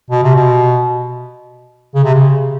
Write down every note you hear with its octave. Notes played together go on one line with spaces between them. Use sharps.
B2
C3
B2
C#3
C3
C#3